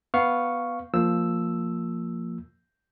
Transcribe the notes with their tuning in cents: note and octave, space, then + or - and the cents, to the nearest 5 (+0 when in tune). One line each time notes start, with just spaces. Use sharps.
B3 +0 F5 +0 C#6 +0
F3 +0 A#3 -15 E6 +0